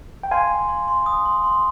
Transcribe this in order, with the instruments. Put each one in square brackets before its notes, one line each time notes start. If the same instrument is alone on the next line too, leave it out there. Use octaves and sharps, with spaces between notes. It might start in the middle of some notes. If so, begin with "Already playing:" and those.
[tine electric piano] G5
[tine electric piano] F5 G#5 [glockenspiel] C6
[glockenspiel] C6
C6
C6
D#6
C6
C6